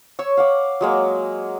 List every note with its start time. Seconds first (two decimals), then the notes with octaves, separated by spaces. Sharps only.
0.19 C#5 C#6 E6
0.37 F5 F#5 D6
0.81 F#3 G#3 A#3